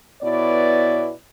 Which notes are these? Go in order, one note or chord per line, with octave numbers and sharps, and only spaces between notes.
B2 B3 E4 C#5 D5